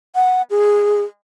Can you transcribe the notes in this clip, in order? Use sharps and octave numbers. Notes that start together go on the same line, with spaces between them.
F#5
G#4